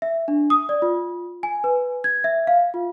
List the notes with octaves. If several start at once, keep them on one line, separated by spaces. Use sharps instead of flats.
E5
D4
D#6
D5
F4
G#5
B4
G#6
E5
F5
F4